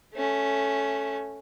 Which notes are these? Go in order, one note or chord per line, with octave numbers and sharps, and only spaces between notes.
A3 C#4